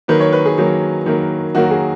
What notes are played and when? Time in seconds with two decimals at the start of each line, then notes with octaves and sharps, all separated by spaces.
0.08 D#3 F#3 A#3 B4
0.20 C#5
0.32 B4
0.46 G#4
0.58 D#3 F#3 A#3
1.06 D#3 F#3 A#3
1.55 D#3 F#3 A#3 F#4
1.71 G#4